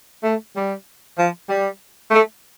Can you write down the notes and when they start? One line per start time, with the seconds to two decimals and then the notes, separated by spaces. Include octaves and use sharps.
0.23 A3
0.54 G3
1.17 F3
1.48 G3
2.11 A3